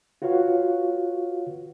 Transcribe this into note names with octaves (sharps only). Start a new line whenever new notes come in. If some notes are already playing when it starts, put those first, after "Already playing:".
F4 F#4 B4 C#5 F5 F#5